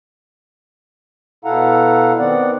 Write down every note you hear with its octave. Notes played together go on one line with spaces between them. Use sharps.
B2 E4 A4 F5 F#5 A#5
D#3 B3 C4 D5 F#5